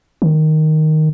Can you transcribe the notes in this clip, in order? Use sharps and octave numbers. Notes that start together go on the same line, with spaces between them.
D#3